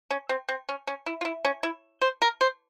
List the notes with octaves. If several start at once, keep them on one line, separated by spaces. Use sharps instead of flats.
C#4
C4
C4
C#4
C#4
E4
F4
E4
C#4
E4
C5
A#4
C5